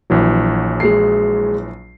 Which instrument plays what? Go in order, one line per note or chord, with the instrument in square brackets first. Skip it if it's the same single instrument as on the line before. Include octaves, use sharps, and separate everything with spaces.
[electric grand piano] A#1 E3 F#3
[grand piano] G#3 G#4 C7